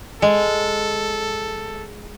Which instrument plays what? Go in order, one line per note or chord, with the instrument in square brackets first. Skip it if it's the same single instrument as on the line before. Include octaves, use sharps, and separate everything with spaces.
[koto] G#3 [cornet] A4